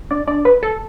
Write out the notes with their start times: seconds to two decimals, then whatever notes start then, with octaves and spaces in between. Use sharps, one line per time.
0.11 D4 D5
0.28 D4 D5
0.45 B4
0.63 A4